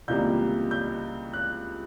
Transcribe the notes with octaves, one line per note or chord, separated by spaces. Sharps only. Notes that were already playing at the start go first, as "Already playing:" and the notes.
C#2 C3 E3 G3 A#3 G6
G6
F#6